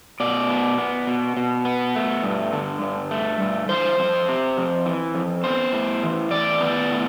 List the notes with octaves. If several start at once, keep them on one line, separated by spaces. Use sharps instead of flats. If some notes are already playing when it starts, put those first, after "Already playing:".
B2 D5
B3
B3
B2
B2
B3
A3
G2
D3
G2
A3
G2
E3 C5
F2
C3
F2
E3
F2
B3 C5
A2
E3
A2 D5
B3
A2